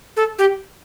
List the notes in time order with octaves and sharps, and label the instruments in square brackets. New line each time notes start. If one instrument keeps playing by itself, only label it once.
[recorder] A4
G4